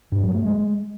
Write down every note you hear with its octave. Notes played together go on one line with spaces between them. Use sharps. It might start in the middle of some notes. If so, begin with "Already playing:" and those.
G2
F#3
A3
G#3